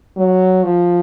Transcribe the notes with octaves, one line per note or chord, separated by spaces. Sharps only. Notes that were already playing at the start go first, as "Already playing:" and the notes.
F#3
F3